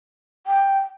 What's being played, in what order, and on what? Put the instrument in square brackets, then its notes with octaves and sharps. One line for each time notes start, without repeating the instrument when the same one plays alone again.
[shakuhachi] G5